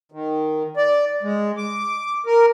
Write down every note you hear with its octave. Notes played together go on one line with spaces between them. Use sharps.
D#3
D5
G#3
D6
A#4